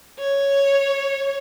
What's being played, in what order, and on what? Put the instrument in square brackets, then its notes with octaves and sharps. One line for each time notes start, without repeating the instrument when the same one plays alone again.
[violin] C#5